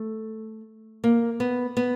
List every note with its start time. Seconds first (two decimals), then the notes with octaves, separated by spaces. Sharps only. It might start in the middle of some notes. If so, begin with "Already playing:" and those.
Already playing: A3
1.04 A#3
1.40 B3
1.77 B3